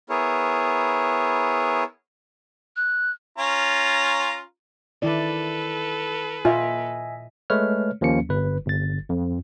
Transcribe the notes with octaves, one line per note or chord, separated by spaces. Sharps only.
B3 E4 G#4 A#4 C#5
F#6
C#4 F4 A#5
D#3 E4 A4 B4 D5
A#2 F4 D#5 E5 G#5
G#3 A3 B4 C#5 F6
D#2 F3 A#3 C#4 C#7
G1 B4
G1 A6
F2